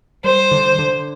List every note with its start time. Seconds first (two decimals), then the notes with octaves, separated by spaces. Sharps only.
0.24 G3 C5
0.51 D3
0.79 D3